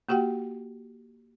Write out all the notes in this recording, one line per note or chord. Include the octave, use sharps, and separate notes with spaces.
A#3 F#4 G4 F#5 G5